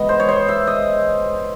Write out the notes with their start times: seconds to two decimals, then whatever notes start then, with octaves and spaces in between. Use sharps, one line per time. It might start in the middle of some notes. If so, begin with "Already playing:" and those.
Already playing: E3 G#3 B3 D#5
0.09 C5
0.20 C#5
0.29 C5
0.48 E5
0.67 D#5